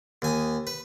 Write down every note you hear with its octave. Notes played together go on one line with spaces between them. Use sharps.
D#2 G#5 D#6
B4